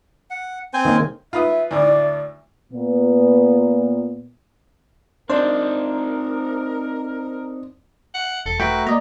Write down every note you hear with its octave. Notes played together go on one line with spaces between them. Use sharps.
F#5
C4 C5 G#5
D#3 A#3 C#4
F4 B4 E5 D#6
D2 A2 D5
A#2 B3
C4 D4 D#4 A#4 C5
F#5
E1 A4
A3 F#4 A#4 B4 G5
A#3 D5 D#5 A#5